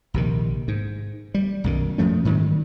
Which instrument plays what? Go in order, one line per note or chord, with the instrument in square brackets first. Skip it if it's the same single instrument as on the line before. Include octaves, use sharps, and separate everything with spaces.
[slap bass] A#1 C3 D#3
G#2
G3
B1 F#2 D#3
F#2 F3 A3 C#4
G#2 D#3 F#3 G3